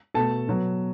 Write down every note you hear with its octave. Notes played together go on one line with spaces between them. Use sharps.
B2 A3 A4 A5
B2 F#3 B3